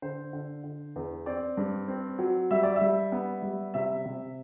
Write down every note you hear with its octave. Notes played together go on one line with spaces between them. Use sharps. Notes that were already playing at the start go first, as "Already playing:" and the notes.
D3 C5
D3
D3
E2
C4 D5
G2
C4
F#3
G3 E5
D5
E5
G3
B3
G3
C3 E5
C3